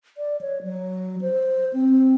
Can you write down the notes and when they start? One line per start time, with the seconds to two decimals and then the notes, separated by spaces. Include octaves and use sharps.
0.18 D5
0.41 C#5
0.63 F#3
1.21 C5
1.73 C4